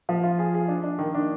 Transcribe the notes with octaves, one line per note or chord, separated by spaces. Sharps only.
F3
F4
G#4
G#4
D4
D4
D#3
D4